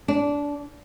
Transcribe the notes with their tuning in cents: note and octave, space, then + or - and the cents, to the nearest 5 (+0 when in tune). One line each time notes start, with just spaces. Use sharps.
D4 -20